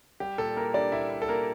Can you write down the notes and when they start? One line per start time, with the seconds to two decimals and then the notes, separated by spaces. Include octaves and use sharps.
0.20 G3 G4
0.38 A#2 A4
0.56 A#3 E4 A#4
0.74 G3 D4 D5
0.92 A#2 E4 E5
1.10 E4
1.22 A4
1.29 A#3 A#4